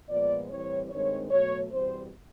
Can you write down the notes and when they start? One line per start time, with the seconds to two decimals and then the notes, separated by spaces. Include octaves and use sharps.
0.10 A#2 F3 G#3 B3 D5
0.50 A2 E3 G3 C4 C#5
0.90 G2 D#3 G#3 C4 C#5
1.31 B2 F#3 A3 C#5
1.71 E2 B2 G3 C4 C5